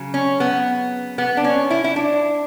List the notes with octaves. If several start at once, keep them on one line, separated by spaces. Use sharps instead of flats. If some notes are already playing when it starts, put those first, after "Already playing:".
Already playing: C#3 F#3
C#4
B3
B3
D4
C#4
E4
E4
D4